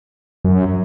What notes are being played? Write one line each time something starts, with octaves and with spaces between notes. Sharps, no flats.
F#2